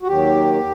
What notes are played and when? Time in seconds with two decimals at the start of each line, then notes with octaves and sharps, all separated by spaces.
0.02 F#4
0.07 D#2 D#3 F#3 G4